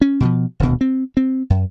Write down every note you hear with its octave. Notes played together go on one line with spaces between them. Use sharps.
C#4
B2 E3 F3
D#1 D2 B2
C4
C4
F#2